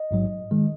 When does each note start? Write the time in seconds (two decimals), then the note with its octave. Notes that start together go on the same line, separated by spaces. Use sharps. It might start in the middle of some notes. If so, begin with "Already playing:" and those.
Already playing: D#5
0.11 A1 G#2 F#3
0.51 D#3 G#3